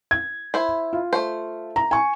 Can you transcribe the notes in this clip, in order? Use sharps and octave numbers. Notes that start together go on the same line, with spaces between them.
G#6
E4 C5
F4
A3 C5
A#5
G#5 C#6